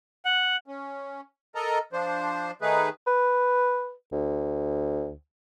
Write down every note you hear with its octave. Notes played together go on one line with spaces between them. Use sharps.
F#5
C#4
A4 A#4 D#5 A#5
F3 D4 C5
D#3 A3 D#4 G#4 B4
B4
D2